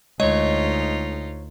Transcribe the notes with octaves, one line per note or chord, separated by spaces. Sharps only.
D2 G#3 D#4 F4 C#5 D#5